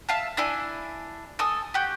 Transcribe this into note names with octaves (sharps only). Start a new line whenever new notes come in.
E5 F5 A5
D4 E4 G#5
A4 G#5 D#6
F#4 G4